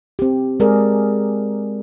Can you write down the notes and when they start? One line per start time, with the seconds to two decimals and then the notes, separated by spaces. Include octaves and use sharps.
0.19 C4 G4
0.60 G#3 G#4 A#4 D5